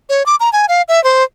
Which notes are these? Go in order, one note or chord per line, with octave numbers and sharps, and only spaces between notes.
C#5
D6
A#5
G#5
F5
E5
C5